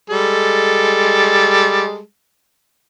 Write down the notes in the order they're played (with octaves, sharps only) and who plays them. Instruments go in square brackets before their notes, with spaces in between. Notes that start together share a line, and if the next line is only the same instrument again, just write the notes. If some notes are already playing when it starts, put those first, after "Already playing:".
[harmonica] G3 G#3 A4